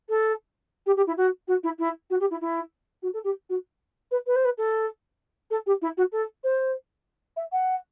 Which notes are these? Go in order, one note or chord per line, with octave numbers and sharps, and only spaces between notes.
A4
G4
G4
E4
F#4
F#4
E4
E4
F#4
G4
E4
E4
F#4
A4
G4
F#4
B4
B4
C5
B4
A4
A4
G4
E4
F#4
A4
C5
E5
F#5